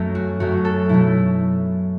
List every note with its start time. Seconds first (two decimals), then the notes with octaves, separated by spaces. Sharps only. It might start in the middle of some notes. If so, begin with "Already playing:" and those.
Already playing: F#2 F#3 A3
0.15 F#4
0.40 F#2 F#3 A3 F#4
0.65 A4
0.89 B2 F#3 A3 E4